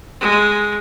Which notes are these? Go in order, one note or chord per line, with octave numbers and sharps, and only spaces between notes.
G#3